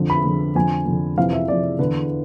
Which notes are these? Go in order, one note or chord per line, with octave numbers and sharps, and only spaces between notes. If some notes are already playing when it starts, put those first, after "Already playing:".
Already playing: F2 D3
B5
F2 D3
F2 D3 G#5
F2 D3
F2 C3 E3 F5
E5
F2 C3 E3 D5
E2 D3 B4